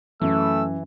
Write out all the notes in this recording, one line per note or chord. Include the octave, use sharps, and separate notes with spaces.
F#2 E3 A3 E6